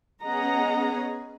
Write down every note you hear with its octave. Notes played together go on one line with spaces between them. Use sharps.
B3 C#4 G#4 D#5 F#5 A#5